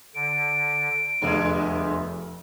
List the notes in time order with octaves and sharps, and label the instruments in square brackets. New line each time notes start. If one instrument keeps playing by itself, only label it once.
[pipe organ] D3 [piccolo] D7
[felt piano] F1 [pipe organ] E2 [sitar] G2 D3 G#3